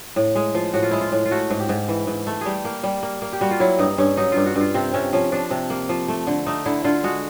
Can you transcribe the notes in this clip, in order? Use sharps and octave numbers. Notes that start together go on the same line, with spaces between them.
A2
G#3
F3
A2 F#4
F4
G#3 E4
F4
A2
F4
A3 F#4
G#2
G4
G#2
E3
G#2
A3
G3 G4 G#4
A#3
G3
A#3
A#3
G4
G3 F#4
F4
F#3 E4
G2 D#4
G2 C#4
F#3 D#4
G2 F4
F#4
G2 F4
C3 C4
C3 C#4
F3 C#4
F3 D4
C3
A#3
F3
A3
D3
A3 D#4
D3 E4
D3 F4
G#3 F#4